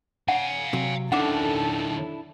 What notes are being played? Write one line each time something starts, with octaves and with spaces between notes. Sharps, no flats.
F5 F#5 G#5
C3 F#3
D#3 C#4 D4 E4 A4 F#5 D6